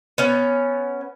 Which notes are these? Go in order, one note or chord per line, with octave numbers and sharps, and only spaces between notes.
B3 C#4